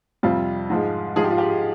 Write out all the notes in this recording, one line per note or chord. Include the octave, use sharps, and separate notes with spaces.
F2 C3 G3 F4
G#2 F3 G#3
G#2 F3 G#3 G#4
G4
F4
G4